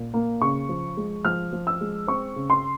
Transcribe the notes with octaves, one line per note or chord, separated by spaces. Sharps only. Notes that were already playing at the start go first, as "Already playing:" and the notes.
Already playing: A#2
A#3
C#3 C#6
F3
G#3
F3 F6
F3
E6
G#3
C4 C#6
C#3
C6